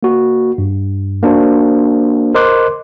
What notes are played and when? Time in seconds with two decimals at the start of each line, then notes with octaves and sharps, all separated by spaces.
0.03 A#3 F#4
0.58 G2
1.23 A#3 D4 F#4 C5
2.35 A#4 C5 D#5 C6 D6 F#6